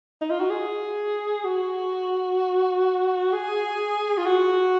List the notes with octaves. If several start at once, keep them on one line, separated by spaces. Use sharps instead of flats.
D#4
F4
F#4
G#4
F#4
G#4
F4
F#4